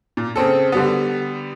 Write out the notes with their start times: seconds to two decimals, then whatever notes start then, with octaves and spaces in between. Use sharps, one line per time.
0.17 A#2
0.36 C#3 C4 A4
0.72 D3 G3 B3